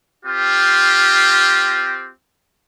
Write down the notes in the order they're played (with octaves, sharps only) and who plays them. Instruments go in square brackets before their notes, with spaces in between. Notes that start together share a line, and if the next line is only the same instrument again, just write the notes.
[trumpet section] C4 F4 G4